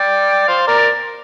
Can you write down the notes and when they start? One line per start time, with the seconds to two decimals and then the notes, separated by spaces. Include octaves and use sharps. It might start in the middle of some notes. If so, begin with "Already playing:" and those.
Already playing: D5 G5
0.48 C5 F5
0.67 A#4 D5